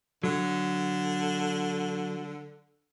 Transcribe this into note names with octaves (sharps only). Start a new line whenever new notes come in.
D3 F#3